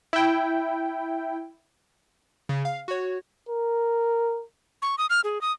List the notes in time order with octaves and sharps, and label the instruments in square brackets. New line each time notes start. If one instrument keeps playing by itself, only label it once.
[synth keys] E4 G5
C#3
F5
F#4 C#5
[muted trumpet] A#4
[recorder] C#6
D#6
F6
G#4
D#6